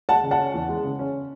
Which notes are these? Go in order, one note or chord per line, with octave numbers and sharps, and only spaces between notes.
G#3 F#5 A5
C#3
F#5 A5
C#4
E2
G#3
C#3
C#4